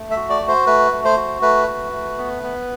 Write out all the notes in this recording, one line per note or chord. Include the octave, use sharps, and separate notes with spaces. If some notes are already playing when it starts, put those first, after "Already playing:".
Already playing: A3
E5
F#4
D5
F#4
C5
A3 B4
A3
C5
F#4
A3 B4
F#4
A3
B3
B3